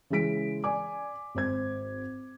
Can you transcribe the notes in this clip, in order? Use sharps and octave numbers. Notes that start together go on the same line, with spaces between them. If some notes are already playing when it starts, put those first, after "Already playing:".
C#3 E3 G#3 G#4 B6 D7
D5 G#5 D6
G#1 C5 G#6